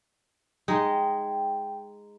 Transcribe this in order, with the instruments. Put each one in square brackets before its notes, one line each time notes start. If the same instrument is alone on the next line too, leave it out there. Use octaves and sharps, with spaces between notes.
[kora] G#3 D#4 [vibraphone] G5